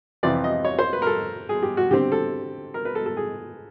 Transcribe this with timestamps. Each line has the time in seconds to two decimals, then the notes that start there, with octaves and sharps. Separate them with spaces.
0.23 F2 C3 E3 D5
0.44 D#5
0.65 C#5
0.79 C5
0.93 B4
1.02 A#4
1.07 A4
1.49 G#4
1.63 G4
1.77 F#4
1.91 D3 G3 C4 G4
2.12 A4
2.74 A#4
2.85 B4
2.95 A4
3.06 A4
3.17 G#4